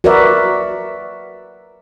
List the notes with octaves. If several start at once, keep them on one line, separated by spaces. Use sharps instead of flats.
F#4 A#4 B4 D5 E5